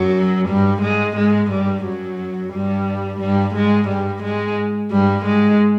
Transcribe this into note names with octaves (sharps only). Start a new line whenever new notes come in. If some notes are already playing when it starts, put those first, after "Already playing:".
Already playing: F#2 F#3
G2 G3
G#2 G#3
G#2 G#3
G2 G3
F#2 F#3
G2 G3
G2 G3
G#2 G#3
G2 G3
G#2 G#3
G2 G3
G#2 G#3